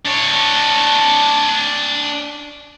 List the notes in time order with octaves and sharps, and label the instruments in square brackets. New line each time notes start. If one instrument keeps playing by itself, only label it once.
[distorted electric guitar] D4 C#5